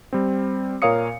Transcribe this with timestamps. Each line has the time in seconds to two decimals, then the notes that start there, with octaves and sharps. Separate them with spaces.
0.13 G3 C4
0.82 A#2 A#4 C#5 F5 D#6 C#7